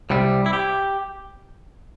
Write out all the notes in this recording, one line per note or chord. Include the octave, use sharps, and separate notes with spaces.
C2 C3 G3
E4
G4